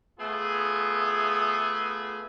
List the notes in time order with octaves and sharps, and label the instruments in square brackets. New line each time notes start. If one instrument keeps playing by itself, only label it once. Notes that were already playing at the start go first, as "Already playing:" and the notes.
[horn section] A3 B3 F4 G#4